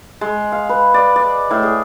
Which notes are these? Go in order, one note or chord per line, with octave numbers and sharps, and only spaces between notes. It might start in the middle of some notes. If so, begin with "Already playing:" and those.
G#3
F5
B4
D5
D5
A2
G#4